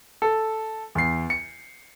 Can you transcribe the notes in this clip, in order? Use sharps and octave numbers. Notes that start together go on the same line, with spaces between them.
A4
E2 C7
C#7